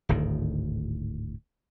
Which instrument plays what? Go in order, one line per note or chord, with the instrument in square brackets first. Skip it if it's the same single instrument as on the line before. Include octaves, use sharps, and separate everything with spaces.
[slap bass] D1 G#1 D2 D#3